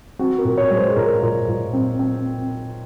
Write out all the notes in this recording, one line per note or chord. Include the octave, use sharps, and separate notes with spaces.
C4 F#4
A#4
A#2
C#5
G#3
C5
G#4
A#2 A#4
A#2
A#2
C4
C4